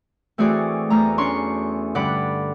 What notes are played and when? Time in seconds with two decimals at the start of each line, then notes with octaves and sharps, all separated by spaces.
0.38 E3 A3 C4 F#4 G#4 D5
0.90 E2 A3 A#5
1.18 C#4 D4 C6 C#6
1.95 G2 D3 D5 F#5 B5